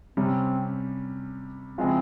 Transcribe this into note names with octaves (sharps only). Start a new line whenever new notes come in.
C3 G3 C4 C#4
C#3 F3 G#3 C4 E4 G#4